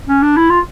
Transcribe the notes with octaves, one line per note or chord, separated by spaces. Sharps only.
C#4
D4
E4
F4